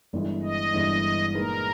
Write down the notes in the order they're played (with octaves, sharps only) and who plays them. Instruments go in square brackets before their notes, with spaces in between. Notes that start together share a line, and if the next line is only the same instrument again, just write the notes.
[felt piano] G1 G2 E3 G#3
[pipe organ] D#5
[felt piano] G1 G2 E3 G#3
[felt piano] A#2 G#3 D#4 G#4 B4 [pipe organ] A#4